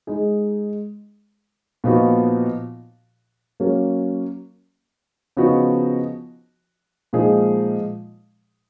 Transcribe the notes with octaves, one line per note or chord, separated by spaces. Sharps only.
G#3 D#4 G#4
A#2 F3 B3 D#4 F#4
F#3 A#3 C#4
C#3 F3 B3 D#4 F#4
A#2 F3 G#3 D#4 G#4